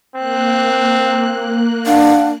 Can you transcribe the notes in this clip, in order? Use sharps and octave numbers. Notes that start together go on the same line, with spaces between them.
A#3 C4 F#6
D4 F5 F#5